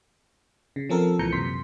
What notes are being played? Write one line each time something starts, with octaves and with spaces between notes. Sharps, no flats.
C#3
F3 C4 A4 A#4
C#2 A#2 E3 A#5 G6 C#7
F#2 C3 C6 B6